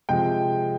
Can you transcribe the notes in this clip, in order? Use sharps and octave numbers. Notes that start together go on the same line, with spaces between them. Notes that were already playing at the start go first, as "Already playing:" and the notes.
C3 F3 G#3 G5